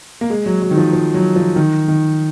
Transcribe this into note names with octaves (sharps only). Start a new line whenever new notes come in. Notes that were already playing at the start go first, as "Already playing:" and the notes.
A#3
G#3
F#3
F#3
D#3
F3
F3
F#3
F3
D#3
D#3